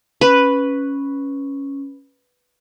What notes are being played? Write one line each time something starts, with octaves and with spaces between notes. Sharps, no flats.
C#4 B4